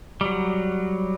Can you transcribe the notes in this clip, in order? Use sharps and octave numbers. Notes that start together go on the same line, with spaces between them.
F#3 G3